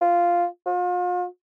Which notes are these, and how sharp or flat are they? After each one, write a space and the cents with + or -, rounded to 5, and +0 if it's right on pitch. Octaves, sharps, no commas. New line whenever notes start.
F4 -5
F4 +40